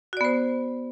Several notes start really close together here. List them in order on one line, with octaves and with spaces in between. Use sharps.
F#4 D5 B3 C5